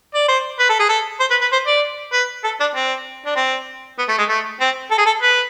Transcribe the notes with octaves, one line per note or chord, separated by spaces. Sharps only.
D5
C5
B4
A4
G#4
A4
C5
B4
B4
C5
D5
B4
A4
D4
C4
D4
C4
B3
A3
G#3
A3
C4
A4
G#4
A4
B4